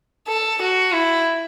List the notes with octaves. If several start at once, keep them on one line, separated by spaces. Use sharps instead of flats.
A4
F#4
E4